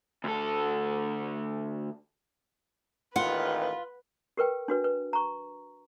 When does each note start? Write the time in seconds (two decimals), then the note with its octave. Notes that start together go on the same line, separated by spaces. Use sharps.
0.24 D2 A4
3.16 A1 D#2 D#3 F4 B4 F#5
4.37 G4 A#4 B4 G5
4.68 D4 F#4 B4
4.84 B4
5.13 A#5 C#6